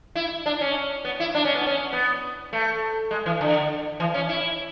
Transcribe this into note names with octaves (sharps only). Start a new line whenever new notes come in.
E4
D4
C#4
B3
E4
D4
C#4
B3
C#4
B3
A3
G#3
E3
D3
E3
C#4
E4